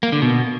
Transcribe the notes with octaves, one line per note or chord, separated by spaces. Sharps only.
A#3
D3
B2